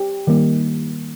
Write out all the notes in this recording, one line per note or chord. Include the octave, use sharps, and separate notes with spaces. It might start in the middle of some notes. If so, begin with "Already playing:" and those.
Already playing: G4
D#3 G3 A#3